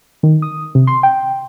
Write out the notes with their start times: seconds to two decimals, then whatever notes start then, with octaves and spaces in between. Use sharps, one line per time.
0.23 D#3
0.42 D#6
0.75 C3
0.87 C6
1.03 G5